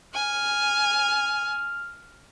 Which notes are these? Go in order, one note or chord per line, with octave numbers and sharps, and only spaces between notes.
G#5 F6